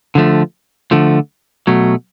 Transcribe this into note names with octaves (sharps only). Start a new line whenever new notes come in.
D3 F3 A3
D3 F3 A3
B2 F#3 A3